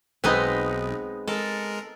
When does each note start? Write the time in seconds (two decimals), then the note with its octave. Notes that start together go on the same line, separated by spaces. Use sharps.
0.24 B1 G#3 B3 C4 D#4 B4 D#5
1.28 G#3 A4 A#4